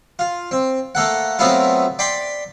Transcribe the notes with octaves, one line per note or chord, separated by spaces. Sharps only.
F4
C4
A3 A#3 A4 F#5
F#3 A3 B3 C4 E4 F4
D5 G5 B5 C6